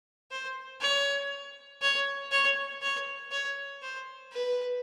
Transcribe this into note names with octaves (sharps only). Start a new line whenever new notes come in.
C5
C#5
C#5
C#5
C#5
C#5
C5
B4